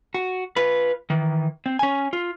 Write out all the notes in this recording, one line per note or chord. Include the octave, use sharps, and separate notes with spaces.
F#4
F4 B4
D#3 E3
C4
C#4 G#5
F4